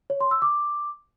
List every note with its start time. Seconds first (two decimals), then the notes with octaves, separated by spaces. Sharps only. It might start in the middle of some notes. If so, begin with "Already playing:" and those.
0.10 C#5
0.21 C6
0.31 E6
0.42 D6